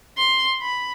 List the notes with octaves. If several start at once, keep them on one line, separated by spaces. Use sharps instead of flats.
C6
B5